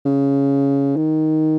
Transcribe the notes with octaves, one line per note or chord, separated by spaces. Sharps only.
C#3
D#3